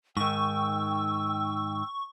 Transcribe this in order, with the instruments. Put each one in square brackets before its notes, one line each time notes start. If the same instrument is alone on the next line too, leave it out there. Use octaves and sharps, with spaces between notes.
[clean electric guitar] G#2 D#3 [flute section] G5 E6 [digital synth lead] C#6